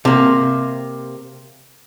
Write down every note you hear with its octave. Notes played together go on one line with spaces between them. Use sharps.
C3 A#3